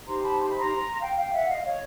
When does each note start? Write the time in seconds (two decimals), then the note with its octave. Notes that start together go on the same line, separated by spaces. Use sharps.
0.07 D#4 G4 C5 A#5 C6
0.23 A5 B5
0.38 C6
0.49 B5
0.60 A#5 C6
1.01 F5 G5
1.17 F5 G5
1.33 E5 F#5
1.48 D#5 F5
1.64 C#5 D#5